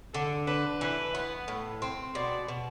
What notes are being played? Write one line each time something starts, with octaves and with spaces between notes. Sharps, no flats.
D3 A4
D4 B4
E3 B4
B3
A2
C4
B2 D5
B2